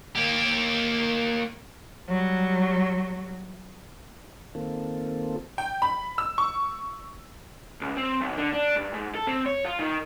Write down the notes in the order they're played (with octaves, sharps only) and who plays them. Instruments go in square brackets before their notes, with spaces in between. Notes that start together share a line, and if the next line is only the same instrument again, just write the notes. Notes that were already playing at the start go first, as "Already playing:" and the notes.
[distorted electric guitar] A#3 G4
[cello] F#3 G3
[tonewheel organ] D#3 A#3 C4 F4 A4
[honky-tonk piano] G5
B5
E6
C#6
[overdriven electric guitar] C#2
C4
B1
D3
D4
G2
G#2
A4
C4
C#5
F4
D#3